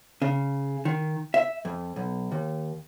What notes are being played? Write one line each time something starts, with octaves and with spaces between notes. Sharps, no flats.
C#3
D#3
E5
F2
B1
D#2